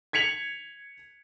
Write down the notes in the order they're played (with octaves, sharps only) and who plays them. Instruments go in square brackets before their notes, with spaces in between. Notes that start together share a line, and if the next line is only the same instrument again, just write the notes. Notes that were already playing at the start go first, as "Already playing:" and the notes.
[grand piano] G#6 B6 C#7 F7 F#7